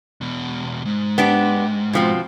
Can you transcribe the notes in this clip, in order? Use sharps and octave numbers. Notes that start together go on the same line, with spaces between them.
E2 B2
G#2
B3 D4 G4
B2 F3 C4